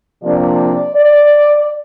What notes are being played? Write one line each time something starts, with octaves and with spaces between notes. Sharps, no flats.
C3 F3 A#3 D4 D5
D5